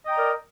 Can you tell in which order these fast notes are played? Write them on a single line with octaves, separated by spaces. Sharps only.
D#5 G5 A#5 D5 A#4